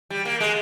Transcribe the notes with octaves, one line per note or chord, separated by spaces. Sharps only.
G3
A#3
G#3